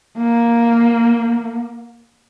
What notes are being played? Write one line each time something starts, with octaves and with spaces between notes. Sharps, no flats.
A#3